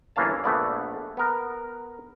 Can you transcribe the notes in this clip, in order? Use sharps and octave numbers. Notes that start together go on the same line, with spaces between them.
G1 E3 A#3 C#4 F5 A5
A#1 A3 B3 D5
B3 A#4